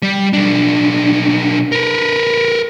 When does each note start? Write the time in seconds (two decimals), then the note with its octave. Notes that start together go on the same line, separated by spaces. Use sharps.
0.02 G3
0.33 B1 D4
1.72 A#4 B4